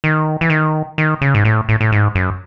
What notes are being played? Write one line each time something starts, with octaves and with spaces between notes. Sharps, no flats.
D#3
E3
D#3
D#3
C#3
G#2
A2
A2
A2
G#2
F#2